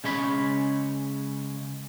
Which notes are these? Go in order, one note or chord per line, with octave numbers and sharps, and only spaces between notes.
C#3 G#3 C#5 B5